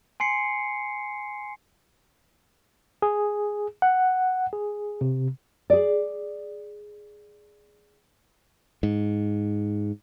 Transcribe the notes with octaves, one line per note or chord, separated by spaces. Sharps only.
G#5 C6 C7 C#7
G#4
F#5
G#4
C3
G#4 D5
G#2